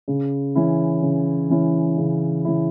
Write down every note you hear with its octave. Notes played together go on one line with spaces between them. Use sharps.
C#3
E3 C#4 E4
C#3
E3 C#4 E4
C#3
E3 C#4 E4